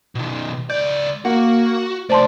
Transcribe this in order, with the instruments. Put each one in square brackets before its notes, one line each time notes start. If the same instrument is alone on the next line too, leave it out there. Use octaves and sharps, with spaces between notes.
[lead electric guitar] B2 D#3
[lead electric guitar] C#2 D5 [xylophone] G6
[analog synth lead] A#3 [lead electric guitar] F#4 [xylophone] F#5
[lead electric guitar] C3 A3 [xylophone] C5 A5 C6 [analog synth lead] D5